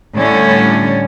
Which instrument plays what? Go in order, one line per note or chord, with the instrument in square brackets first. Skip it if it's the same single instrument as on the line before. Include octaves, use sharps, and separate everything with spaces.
[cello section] A2 D3 G3 A3 C#4